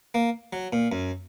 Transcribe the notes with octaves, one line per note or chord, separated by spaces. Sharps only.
A#3
F#3
A#2
F#2